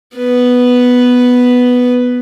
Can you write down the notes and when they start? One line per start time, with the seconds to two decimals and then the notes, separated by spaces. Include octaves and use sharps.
0.17 B3 B4